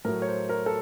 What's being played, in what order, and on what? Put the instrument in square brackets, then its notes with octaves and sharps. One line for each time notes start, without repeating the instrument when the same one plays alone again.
[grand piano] A2 F#3 A#4
C#5
C5
A#4
A4